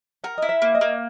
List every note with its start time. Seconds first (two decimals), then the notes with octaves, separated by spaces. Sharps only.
0.24 A#4 F#5
0.38 E4 D#5
0.49 E5
0.62 A#3
0.75 D#5
0.81 A#3